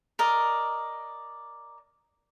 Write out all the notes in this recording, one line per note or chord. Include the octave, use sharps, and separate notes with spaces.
A#4 D5 D#5